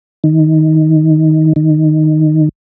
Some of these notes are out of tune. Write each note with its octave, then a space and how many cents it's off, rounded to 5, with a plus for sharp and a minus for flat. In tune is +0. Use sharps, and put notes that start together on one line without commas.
D#3 +15
D#3 -5